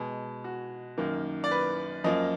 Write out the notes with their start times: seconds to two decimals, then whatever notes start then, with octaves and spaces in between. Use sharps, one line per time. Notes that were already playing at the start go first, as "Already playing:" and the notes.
Already playing: B2 G#3
0.44 F#4
0.98 F#2 D#3 A#3
1.44 D5
1.51 B4
2.04 F#2 F3 A#3 D#5